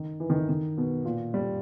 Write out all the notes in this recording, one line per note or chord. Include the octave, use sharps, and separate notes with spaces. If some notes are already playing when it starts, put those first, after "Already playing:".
Already playing: D#3
E3
D#3
E3
D#3
B2
A#2
G3